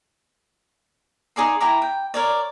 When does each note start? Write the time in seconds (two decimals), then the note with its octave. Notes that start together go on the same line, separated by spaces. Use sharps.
1.36 D#4 G#4 D5 C6
1.60 E4 G5 A#5 D6
1.82 G5
2.14 A#4 C#5 D5